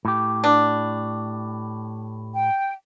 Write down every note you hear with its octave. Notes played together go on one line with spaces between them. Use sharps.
A2 G4
D4
G5